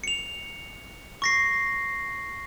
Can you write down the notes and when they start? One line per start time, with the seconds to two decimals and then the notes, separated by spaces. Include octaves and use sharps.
0.04 C#7 F7
1.22 C#6 A#6 C7